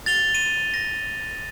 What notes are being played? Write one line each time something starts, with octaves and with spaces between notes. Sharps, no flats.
A6 F7 G7
D#7
A#6